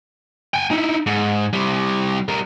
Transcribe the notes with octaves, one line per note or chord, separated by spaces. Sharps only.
G5 G#5
D#4 E4
G#2
C3 G3
G3 A#4